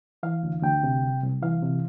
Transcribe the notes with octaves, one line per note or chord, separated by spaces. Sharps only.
E3 F5
D2
D2 G5
C3
C2
C2
E3 F5
C3